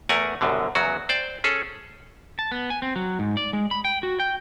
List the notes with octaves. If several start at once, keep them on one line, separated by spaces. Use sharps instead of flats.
E2 A3 A#4 F#5 G#5
C2 F#2 B2 D3
E2 C#3 F#3 F#4
C5 D5 G5
C#4 G#4 A4
A5
B3
G#5
C4
F#3
G#2
D5
G#3
B5
G5
F#4
G5